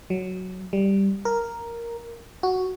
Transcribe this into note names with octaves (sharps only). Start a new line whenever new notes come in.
F#3
G3
A#4
F#4